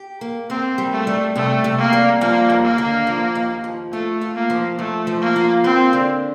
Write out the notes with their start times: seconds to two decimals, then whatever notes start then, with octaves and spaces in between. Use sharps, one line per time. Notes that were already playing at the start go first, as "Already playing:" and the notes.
Already playing: G4
0.21 A#3
0.50 A#3 C4
0.78 G3
0.93 A3
1.07 G3
1.35 C3 A3
1.64 C3
1.78 A#3
1.93 G3
2.21 F3 A#3
2.50 D#2
2.64 A#3
2.78 D3
3.07 F3
3.35 D#2
3.64 F3
3.92 A3 F4
4.21 F4
4.35 A#3
4.50 F3
4.78 F3 A3
5.07 F3
5.22 A#3
5.36 F4
5.64 A#3 C4
5.93 D3